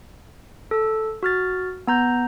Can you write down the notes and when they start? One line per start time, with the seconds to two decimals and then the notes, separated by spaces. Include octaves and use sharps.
0.71 A4 E6
1.23 F#4 F6 A6
1.87 B3 A#5 G6